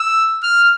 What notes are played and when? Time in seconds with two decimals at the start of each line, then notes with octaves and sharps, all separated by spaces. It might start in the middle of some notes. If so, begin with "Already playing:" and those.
Already playing: E6
0.43 F6